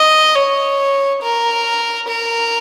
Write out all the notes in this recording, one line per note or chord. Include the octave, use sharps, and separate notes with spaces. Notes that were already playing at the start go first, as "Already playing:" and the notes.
Already playing: D#5
C#5
A#4
A#4